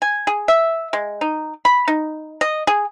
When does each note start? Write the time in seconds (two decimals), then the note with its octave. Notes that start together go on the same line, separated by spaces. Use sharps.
0.02 G#5
0.27 G#4
0.48 E5
0.93 G#3
1.21 D#4
1.65 B5
1.88 D#4
2.41 D#5
2.67 G#4